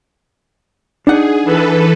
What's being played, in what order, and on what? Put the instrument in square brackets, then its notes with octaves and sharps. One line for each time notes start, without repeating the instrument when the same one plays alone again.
[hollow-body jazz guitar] D4 D#4 F#5 [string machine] G#4
[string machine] E3 A4 B4